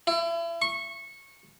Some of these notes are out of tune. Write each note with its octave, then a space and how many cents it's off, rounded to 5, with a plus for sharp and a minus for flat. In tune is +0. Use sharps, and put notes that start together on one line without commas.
E4 +35
C#6 -15